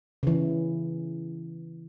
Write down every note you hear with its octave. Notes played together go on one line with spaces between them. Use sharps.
C#3 E3